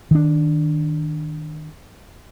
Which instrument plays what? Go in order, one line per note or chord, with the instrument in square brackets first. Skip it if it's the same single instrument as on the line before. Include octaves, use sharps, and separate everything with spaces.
[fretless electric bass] D#3 D4